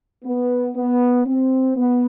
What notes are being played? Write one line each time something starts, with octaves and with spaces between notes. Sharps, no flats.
B3
B3
C4
B3